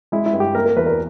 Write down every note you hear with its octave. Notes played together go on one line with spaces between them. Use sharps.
G#3 E4
E4
G2
G4
A#3 A#4
A#4
E2 B4
A#4